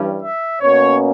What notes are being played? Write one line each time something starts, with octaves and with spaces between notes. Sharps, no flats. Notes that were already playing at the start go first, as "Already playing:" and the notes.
Already playing: G2 E3 G3 C#4
E5
B2 A#3 C#4 C#5